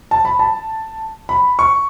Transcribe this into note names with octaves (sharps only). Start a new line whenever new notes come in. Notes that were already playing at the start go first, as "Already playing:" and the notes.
A5
B5
A5
B5
C#6